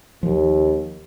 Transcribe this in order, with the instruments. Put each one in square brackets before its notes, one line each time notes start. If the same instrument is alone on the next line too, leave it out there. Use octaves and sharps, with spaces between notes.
[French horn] D#2 [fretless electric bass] F3